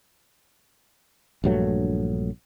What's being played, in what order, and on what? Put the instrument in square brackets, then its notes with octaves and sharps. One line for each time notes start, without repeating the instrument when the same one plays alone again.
[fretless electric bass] A#1 G2 F#3 A3